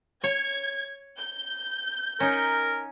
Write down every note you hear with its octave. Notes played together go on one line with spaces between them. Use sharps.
C#5 G#6
G6
C#4 D#4 A#4